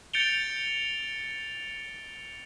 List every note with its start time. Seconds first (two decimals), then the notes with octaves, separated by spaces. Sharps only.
0.14 G6 A6 C#7 D7 F7 G7